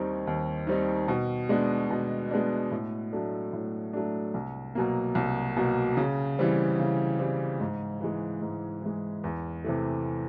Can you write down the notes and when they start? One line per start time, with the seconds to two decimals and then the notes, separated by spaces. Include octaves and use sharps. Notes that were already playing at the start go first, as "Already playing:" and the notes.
Already playing: D#2 D#3 G3 C4 D#4
0.27 D#2
0.67 D#3 G3 C4 D#4
1.08 B2
1.49 G#3 B3 D4
1.90 B2
2.31 G#3 B3 D4
2.71 A2
3.13 F#3 A3 D4
3.53 A2
3.93 F#3 A3 D4
4.34 C2
4.75 B2 F#3 A#3
5.15 C2
5.56 B2 F#3 A#3
5.97 C#3
6.39 E3 G3 C4
6.79 C#3
7.19 E3 G3 C4
7.60 G#2
8.01 E3 G#3
8.42 G#2
8.82 E3 G#3
9.24 E2
9.64 C3 E3 A3